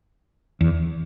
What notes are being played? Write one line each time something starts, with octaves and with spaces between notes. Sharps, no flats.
E2